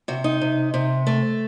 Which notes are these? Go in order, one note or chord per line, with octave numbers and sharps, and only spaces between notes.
C3 F#4
D#4
C3
C3
A3